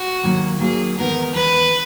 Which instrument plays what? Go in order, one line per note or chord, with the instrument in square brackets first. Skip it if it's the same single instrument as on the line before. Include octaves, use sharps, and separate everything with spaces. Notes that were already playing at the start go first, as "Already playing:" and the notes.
Already playing: [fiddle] F#4
[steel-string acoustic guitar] D#2 D#3 F#3 A#3
[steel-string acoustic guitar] D#2 D#3 F#3 A#3 [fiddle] G#4
[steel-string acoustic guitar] E2 D#3 G#3 B3 [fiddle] A#4
[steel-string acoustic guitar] E2 D#3 G#3 B3 [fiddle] B4